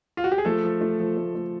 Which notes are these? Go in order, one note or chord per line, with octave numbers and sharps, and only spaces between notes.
F4
F#4
G4
G#4
F3 A3 A4
F3
A3
F3
A3
A3